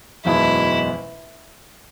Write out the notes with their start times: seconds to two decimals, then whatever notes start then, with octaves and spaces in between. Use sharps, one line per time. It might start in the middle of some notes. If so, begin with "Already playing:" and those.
0.25 F#1 E2 B2 G#3 D#4 E4